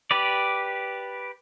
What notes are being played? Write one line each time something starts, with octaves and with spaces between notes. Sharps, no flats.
G4 B4 D5